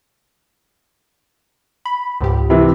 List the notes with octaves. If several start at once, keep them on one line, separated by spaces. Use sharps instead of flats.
B5
C#2 G#2 G4
C3 E3